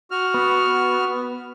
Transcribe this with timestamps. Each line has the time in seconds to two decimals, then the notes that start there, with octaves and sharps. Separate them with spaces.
0.11 F#4 F6
0.34 B3